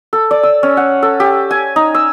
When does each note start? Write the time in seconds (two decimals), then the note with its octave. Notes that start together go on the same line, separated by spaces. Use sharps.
0.13 A4
0.31 D5
0.43 E6
0.63 C#4
0.77 F#5
1.02 A4
1.20 G4
1.51 G#5
1.76 D#4
1.95 E6